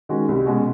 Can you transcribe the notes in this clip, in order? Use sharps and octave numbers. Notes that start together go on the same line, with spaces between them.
D#3 G#3 C#4 F#4
C2
B2 G#3 C#4 F#4